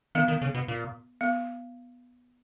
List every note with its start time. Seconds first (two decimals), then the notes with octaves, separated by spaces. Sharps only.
0.15 D#3 B3
0.28 D#3
0.41 C#3
0.54 B2
0.68 A#2
1.21 B3